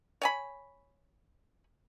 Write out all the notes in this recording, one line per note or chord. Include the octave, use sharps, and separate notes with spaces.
C#5 G#5 B5